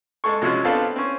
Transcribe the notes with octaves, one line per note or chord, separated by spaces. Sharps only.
G#3 A4 C#6
C3 F3 G#3 C#4 F#4
B3 C4 D4 F4 A4 B4
C4 C#4